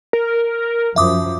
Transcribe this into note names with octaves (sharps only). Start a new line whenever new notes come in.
A#4
F#2 F3 E5 D6 D#6